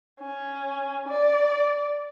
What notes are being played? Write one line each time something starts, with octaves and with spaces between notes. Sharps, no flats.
C#4
D5